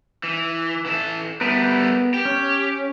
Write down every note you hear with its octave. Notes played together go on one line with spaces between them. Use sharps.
E3
E3 A4
G3 A3 B3 A#4 B4
G4
C#4